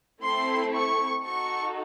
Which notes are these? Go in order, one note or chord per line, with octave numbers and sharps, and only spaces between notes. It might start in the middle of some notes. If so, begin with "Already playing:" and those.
A3 C4 E4 A4 C6
C#6
D#4 F#4 A4 C#6